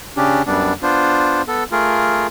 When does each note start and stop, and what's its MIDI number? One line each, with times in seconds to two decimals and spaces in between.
0.17 0.42 49
0.17 0.42 61
0.17 0.42 62
0.17 0.42 67
0.47 0.73 42
0.47 0.73 55
0.47 0.73 59
0.47 0.73 62
0.83 1.42 59
0.83 1.42 62
0.83 1.42 65
0.83 1.42 72
1.48 1.64 59
1.48 1.64 69
1.72 2.27 57
1.72 2.27 65
1.72 2.27 68
1.72 2.27 70